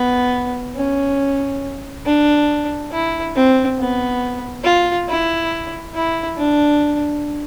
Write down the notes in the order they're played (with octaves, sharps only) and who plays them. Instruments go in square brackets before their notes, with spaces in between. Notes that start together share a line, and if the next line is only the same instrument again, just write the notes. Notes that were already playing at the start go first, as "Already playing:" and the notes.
Already playing: [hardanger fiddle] B3
C#4
D4
E4
C4
B3
F4
E4
E4
D4